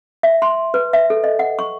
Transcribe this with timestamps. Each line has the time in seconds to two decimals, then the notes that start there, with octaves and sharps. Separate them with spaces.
0.23 E5
0.42 C6
0.74 B4
0.93 E5
1.10 A4
1.24 D#5
1.39 F#5
1.59 C#6